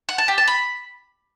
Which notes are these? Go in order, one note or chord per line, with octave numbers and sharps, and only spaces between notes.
F#5
A5
G4
A5
B5